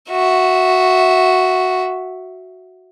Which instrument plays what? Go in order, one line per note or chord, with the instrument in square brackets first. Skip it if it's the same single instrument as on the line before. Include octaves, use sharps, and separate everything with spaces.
[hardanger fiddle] F#4 E5